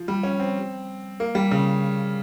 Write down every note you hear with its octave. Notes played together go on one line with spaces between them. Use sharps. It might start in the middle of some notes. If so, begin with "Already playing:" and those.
Already playing: F3
G3
C#4
C4
A#3
G3
C#3